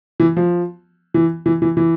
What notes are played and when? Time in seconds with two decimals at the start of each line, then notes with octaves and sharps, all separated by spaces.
0.20 E3
0.37 F3
1.14 E3
1.46 E3
1.62 E3
1.77 E3